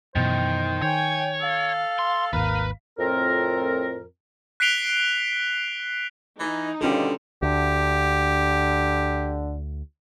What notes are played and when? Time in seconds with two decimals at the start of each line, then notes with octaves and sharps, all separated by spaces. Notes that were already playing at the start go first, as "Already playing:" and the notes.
0.16 F#2 B2 D#3 E3 C5
0.82 D#3 C#5 G5 G#5
1.41 A4 F5
1.99 C6
2.33 G#1 D#2 A#4 B4
2.99 F2 A2 C4 F4 A#4
4.60 F#6 B6 C7 D7 F7 G7
6.39 E3 D#4
6.81 B2 D3 D#3 G3 C#4 F4 A4
7.42 D2 D3 G4